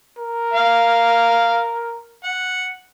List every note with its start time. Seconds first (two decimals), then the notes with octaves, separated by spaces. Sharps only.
0.18 A#4
0.53 F5
2.24 F#5